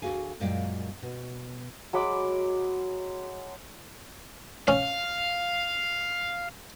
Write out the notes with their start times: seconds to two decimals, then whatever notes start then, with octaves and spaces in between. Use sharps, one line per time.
0.02 D2 A#2 F#4 G#4 F5 G#5
0.40 F#2 A#2 G#3 D5 F5 G5
1.03 B2
1.93 F#3 G#3 B5 D6
4.68 C#4 F5